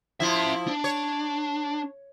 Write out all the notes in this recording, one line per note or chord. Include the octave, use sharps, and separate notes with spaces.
F3 E4 E5 C6
D4
C#5